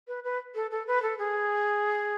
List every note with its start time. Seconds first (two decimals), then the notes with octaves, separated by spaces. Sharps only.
0.08 B4
0.24 B4
0.55 A4
0.71 A4
0.87 B4
1.02 A4
1.19 G#4